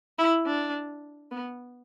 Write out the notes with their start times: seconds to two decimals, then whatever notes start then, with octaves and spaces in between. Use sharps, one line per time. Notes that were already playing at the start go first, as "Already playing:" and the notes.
0.19 E4
0.46 D4
1.31 B3